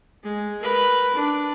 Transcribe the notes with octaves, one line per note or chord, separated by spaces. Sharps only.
G#3
A#4 B4
D4